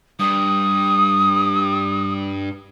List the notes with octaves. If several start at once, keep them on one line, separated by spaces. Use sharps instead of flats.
G2 D#6